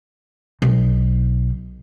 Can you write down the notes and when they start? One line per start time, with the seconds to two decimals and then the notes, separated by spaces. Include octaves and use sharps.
0.62 B1